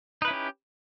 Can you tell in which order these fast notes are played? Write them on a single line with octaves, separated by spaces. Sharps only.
D#4 B4 E4 C#4 G4